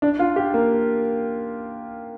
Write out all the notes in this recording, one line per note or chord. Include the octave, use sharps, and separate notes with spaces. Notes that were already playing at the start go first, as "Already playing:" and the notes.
D4
F4
G4
A#3